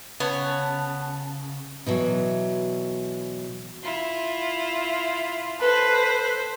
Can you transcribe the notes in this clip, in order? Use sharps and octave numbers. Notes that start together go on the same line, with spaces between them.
C#3 B3 C#5 A5
B2 E3 F#3
E4 F4
A4 B4 C5